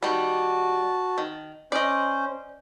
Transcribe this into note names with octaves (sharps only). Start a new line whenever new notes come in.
D#3 G3 F#4 A5
D#3
C#4 C5 D5 D#5